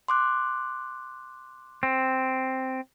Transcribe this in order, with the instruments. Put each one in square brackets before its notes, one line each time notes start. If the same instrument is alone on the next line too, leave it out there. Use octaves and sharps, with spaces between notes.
[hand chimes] C6 D6 F#6
[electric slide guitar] C4